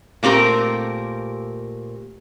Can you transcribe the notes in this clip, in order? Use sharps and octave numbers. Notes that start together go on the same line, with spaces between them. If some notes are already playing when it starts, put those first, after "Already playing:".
A#2 A3 C4 G4 A#4